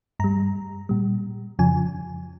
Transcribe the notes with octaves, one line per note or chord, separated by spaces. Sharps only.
G2 G3 A#5
A#2 G3
F2 C#3 F3 G#5